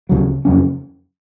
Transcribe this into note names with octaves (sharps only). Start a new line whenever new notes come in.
C#2 C#3 F#3
F2 C#3 F#3 C#4